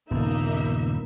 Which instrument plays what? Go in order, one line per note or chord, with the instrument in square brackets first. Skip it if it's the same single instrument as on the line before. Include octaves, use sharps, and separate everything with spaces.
[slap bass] D#1 G2 [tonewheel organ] C#3 B3 [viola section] A#3 D#4 E5